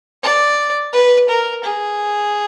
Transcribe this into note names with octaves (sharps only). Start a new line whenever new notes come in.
D5
B4
A#4
G#4